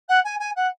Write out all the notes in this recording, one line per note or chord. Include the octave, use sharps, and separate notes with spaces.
F#5
G#5
G#5
F#5